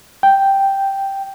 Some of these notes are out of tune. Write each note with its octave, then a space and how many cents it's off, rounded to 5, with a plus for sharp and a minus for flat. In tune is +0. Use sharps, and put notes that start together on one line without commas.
G5 +0